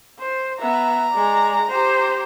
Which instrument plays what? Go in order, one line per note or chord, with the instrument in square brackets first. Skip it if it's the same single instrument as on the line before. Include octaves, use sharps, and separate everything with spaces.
[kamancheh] C5
[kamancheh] B3 E5 [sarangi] A#5
[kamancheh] G#3 D5
G4 C5